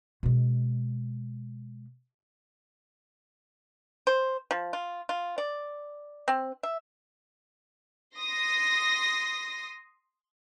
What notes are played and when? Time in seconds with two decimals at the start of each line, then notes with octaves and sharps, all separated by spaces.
0.23 B2 G#3
4.07 C5
4.51 F3
4.73 F4
5.09 F4
5.38 D5
6.28 C4
6.63 E5
8.17 C6 D#6 A#6